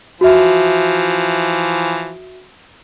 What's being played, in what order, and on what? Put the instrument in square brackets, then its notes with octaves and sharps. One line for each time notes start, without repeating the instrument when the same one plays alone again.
[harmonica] E3 F3 [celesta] F#4 E5